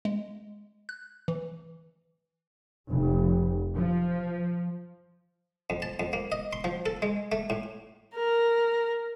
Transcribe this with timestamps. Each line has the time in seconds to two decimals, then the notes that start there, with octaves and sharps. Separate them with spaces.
0.05 G#3
0.89 F#6
1.28 E3
2.90 F1
3.74 F3
5.70 F2
5.82 A5
6.00 F2
6.13 A#3
6.32 D#5
6.53 C6
6.64 F3
6.86 A4
7.02 G#3
7.32 A3
7.50 A2
8.15 A#4